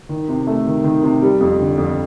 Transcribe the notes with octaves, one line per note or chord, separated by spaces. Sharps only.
D#3
C3
A3
D#3
D#3
C3
G3
F2
D3
F2